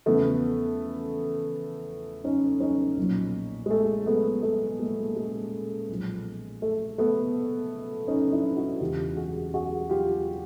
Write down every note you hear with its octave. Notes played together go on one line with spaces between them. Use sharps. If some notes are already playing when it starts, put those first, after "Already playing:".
E2 C#3 F3 A3 B3
C#4 D#4
C#4 D#4
B1 A#2 F3
G#3
A3
A3 B3
A3 B3
G#3 A#3
G#3
B1 A#2 F3
A3
A3 B3
C#4 D#4
D4 E4
E4 F#4
E1 E2 C#3 E3 F4 G4
F#4 G#4
F#4 G#4
F4 G4